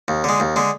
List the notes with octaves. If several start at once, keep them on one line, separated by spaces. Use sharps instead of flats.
D#2
D3 G#3
D#2
D3 G#3